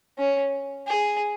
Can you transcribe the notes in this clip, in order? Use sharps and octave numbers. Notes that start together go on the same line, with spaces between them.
C#4
G#4